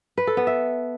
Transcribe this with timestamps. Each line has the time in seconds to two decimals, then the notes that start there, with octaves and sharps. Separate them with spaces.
0.18 B4
0.27 A4
0.37 B3
0.47 E5